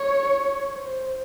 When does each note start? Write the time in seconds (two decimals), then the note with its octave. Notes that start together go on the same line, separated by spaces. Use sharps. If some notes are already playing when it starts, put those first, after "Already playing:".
Already playing: C#5
0.75 C5